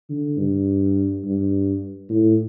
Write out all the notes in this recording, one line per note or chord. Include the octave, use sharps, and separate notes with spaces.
D3
G2
G2
A2